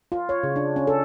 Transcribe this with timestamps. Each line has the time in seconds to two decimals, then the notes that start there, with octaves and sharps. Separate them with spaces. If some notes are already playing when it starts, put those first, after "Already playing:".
0.12 F4
0.29 C#5
0.43 C#3
0.56 D4
0.76 C#4
0.87 A4